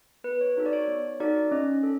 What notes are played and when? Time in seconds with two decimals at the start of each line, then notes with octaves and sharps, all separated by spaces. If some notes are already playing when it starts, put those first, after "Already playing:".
0.24 B3 B4
0.41 C#5
0.57 D#4 F#4 A4
0.66 D5
0.73 C#5
0.88 B3
1.20 D#4 F#4 A4 D5
1.51 C#4 D#5
1.83 A4